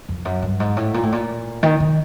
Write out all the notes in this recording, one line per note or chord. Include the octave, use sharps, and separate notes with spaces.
F2
F#2
G2
G#2
A2
A#2
A2
A#2
D#3
D#3